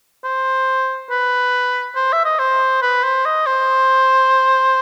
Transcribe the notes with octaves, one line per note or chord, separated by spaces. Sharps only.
C5
B4
C5
E5
D#5
C5
B4
C5
D#5
C5